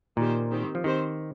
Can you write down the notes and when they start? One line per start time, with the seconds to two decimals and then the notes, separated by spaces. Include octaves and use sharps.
0.17 A#2 D#3 A#3 G4 C5
0.51 D#3 C4 G4
0.75 F3
0.84 D#3 C4 G4 C5